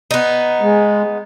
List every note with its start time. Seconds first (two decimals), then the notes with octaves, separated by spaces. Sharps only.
0.11 B3 D#4
0.61 G#3